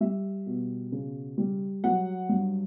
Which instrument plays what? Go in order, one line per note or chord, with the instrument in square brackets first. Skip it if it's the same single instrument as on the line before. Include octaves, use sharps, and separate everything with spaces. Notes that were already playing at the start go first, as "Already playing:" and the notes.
[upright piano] G3 E5
B2
C#3
G3
F#3 F#5
G2